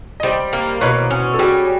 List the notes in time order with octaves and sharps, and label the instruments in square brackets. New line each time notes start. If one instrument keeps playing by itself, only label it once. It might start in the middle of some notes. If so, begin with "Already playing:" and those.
[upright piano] D#5
[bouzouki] G3 [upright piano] C5 D5
[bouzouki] A#3
[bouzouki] B2 [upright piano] B4 C#5
[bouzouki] C#4
[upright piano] A4
[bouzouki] G3 [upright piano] F#4 G#4